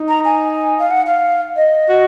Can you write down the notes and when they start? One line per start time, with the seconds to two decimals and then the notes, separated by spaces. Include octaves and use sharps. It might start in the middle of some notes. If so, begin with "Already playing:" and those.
Already playing: D#4
0.08 A#5
0.25 G#5
0.79 F5
0.91 F#5
1.07 F5
1.56 D#5
1.89 F#4